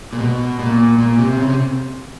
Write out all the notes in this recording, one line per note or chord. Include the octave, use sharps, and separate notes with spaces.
A#2
B2
A#2
A#2
C3
C#3
C3